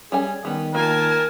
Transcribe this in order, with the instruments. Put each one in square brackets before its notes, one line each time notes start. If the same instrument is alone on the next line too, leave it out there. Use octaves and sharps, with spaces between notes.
[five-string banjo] G3 C#4 G#5 [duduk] G#4
[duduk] D#3 [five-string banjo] G3 B3
[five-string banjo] A#3 F4 [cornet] A#4 [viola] G#5 A5